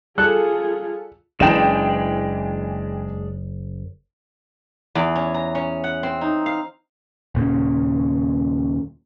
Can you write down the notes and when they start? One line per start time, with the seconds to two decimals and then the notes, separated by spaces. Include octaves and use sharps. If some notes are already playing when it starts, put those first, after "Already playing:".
0.18 G3 F4 G#4 A4 F#6 C#7
1.40 F#1 E3 G#3 D4 G5 E7
4.95 E2
5.15 C#4
5.34 A#5
5.55 C#4
5.84 F#5
6.03 C4
6.21 D#4
6.46 F5
7.35 D#1 A#2 C#3